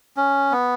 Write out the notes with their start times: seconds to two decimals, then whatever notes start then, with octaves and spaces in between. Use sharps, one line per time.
0.17 C#4
0.51 B3